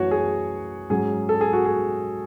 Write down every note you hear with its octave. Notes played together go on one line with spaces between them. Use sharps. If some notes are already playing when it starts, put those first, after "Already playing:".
Already playing: F#2 E3 A3 C#4 F#4 C#5
G#4
G#2 F#3 C#4 G#4
A4
G#4
F#4
G#4